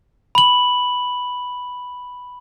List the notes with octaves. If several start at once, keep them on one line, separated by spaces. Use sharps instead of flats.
B5 F#7